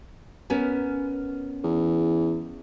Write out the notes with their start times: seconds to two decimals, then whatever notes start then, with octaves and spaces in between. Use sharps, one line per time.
0.50 B3 C#4 A#4
1.63 E2